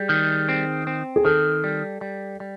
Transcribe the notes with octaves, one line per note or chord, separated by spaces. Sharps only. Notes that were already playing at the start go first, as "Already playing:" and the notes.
Already playing: G3 G#4
D#3
C4
C4
G#4
D#3 A4
G3
G3
G3